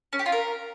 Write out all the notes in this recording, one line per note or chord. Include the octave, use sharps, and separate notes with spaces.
C#4
G4
F4
A#4